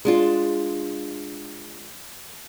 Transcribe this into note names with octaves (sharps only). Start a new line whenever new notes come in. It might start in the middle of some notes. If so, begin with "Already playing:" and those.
G#3 D4 F4